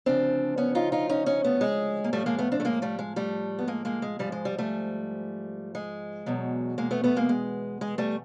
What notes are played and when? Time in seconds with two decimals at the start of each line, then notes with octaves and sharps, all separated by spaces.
0.06 D2 C#3 F3 C4 D4
0.58 B3 C#4
0.75 D#4 F4
0.92 D#4 F4
1.09 C#4 D#4
1.26 C#4 D#4
1.44 A3 B3
1.61 G#3
2.04 A#3
2.13 A2 F3 G3 A3
2.26 G#3 A#3
2.38 A3 B3
2.52 C4 D4
2.60 A3
2.65 G#3 A#3
2.82 G3 A3
2.99 G#3
3.16 G3 A3
3.59 B3
3.68 G#3 A#3
3.85 G#3 A#3
4.02 G#3
4.19 G#2 F3 G3
4.32 G#3
4.45 G3
4.58 G3 A3
5.75 G#3
6.26 E2 B2 F#3
6.78 G#3 A#3
6.91 A3 B3
7.04 A3 B3
7.16 G#3 A#3
7.29 G#3
7.81 G#3
7.98 G3 A3